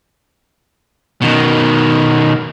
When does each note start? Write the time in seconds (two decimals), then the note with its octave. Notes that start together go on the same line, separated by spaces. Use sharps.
1.22 B2 D#3